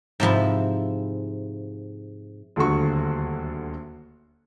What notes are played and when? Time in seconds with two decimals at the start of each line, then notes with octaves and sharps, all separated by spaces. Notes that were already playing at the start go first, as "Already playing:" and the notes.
0.20 G#2 C3 F3 E4
2.56 D#1 D2 D3 F#4 C#6